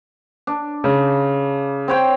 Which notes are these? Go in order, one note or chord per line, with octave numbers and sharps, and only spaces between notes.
D4
C#3
C4 C#5 G5